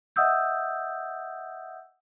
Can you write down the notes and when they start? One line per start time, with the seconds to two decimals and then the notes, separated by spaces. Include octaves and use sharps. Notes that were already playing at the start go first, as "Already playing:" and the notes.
0.16 D#5 E5 F#5 D#6 E6 G6